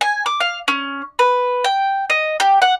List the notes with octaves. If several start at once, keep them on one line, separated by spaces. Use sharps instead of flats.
G#5
D6
F5
C#4
B4
G5
D#5
G4
F#5